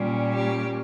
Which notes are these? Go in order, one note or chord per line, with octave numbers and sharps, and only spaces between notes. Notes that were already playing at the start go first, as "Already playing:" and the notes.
Already playing: A#2 G3 A#3 C#4
G4